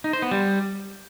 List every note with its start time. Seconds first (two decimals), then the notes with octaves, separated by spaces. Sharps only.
0.04 D#4
0.13 C5
0.22 B3
0.31 G3